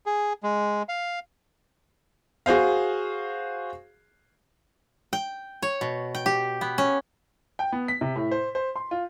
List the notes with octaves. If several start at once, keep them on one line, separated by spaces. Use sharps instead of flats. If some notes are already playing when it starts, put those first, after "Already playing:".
G#4
G#3
F5
F#4 G#4 C5 F5
G5
C#5
B2
G5
G4
B3
C#4
G5
B3
B6
C3
A2
C5
C5
C6
F4